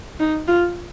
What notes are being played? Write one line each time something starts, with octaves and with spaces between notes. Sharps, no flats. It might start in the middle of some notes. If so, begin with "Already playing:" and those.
D#4
F4